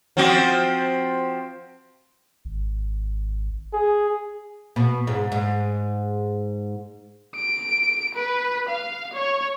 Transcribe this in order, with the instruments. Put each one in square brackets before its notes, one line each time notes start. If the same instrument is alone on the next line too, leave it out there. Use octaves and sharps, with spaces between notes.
[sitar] F3 C4 F#4
[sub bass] G#1
[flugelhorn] G#4
[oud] B2
G#2
G#2
[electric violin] D7
B4
F5
C#5